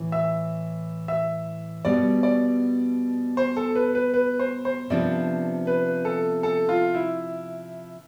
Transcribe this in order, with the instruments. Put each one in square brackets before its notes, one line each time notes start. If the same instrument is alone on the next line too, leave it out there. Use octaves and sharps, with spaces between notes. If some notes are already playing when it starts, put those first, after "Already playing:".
Already playing: [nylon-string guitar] A2 E3
[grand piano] E5
E5
[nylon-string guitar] B2 G3 B3 [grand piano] D5
[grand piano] D5
C5
A4
B4
B4
B4
C5
C5
[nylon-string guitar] C3 F3 B3 D4 [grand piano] D5
[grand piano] B4
A4
A4
F4
E4